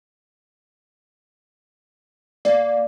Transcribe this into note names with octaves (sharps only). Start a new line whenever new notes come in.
A#3 D5